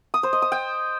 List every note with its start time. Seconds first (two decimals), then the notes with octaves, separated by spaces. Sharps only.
0.14 D#6
0.23 C5
0.33 D#5
0.42 D#6
0.52 G5